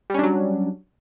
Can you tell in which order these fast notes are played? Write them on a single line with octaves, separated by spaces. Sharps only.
G3 C#4 D4 F#3